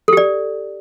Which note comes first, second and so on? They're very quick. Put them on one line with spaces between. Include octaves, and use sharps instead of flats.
A4 G4 D5